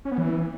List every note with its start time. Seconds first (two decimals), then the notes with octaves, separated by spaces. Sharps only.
0.05 C#4
0.11 B3
0.18 E3